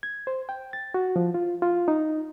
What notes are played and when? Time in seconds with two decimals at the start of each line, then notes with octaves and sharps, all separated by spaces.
0.03 G#6
0.27 C5
0.49 G5
0.73 A6
0.94 F#4
1.16 F3
1.34 F4
1.62 F4
1.88 D#4